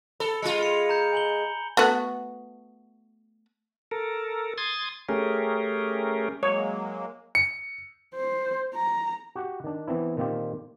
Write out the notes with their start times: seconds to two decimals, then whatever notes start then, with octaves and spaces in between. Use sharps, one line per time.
0.20 A4 B5
0.42 G#3 F4 C#7
0.61 B5 C#7 F7
0.89 A#5 G6 C#7
1.13 G#5 F#7 G7
1.77 A3 B3 F#4
3.91 A4 A#4
4.58 C6 D#6 G#6 A6
5.09 A3 C#4 G4 G#4 A#4
6.43 F#3 G#3 A#3 C#5
7.35 C#7
8.16 C5
8.75 A#5
9.36 F#4 G4 F#5
9.64 D#3 D4
9.88 E3 B3 C4 D4 E4
10.17 A#2 D#3 C4 F4 G4